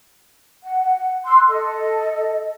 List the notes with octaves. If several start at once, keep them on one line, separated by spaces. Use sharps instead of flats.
F#5
C6 E6 F#6
A4 D#5